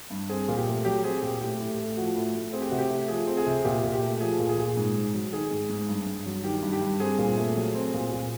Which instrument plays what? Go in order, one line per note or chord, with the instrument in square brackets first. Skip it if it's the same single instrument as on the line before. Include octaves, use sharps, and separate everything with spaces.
[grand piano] G2
C4 G#4
A#2
G4
A3
F#3 G4
C4 G#4
A#2 G4
A2 G4
A2
A3
F3 F#4
A2
A2
C4 G#4
G4
C3 F#4
G4
A3
F3 G#4
C4
G#4
C3
A#2 G4
A#2
G4
A3
F3 G#4
A#2
G#4
A#2
G#2
G#2
F#3
D#3 G#4
G#2
G#2
G2
G2
F#3
D#3 G4
G2
G4
G2
C4 G#4
A#2
A3
F#3
C4
A#2
A#2